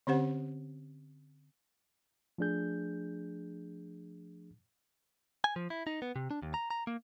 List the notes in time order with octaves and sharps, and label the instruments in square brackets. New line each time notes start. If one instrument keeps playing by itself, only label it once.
[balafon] D3 C4 C#4 G4 C5 F#5
[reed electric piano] F3 A3 D4 G#4 G6
[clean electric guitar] G#5
F3
E4
D#4
B3
C3
D4
D#2
A#5
A#5
A#3